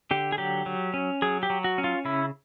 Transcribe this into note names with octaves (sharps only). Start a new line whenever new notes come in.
D3 G4
G#4
F#3 G4
F#3
C#4
F#3 G#4
G4
F#3
F#4
C#4
F4
C#3 E4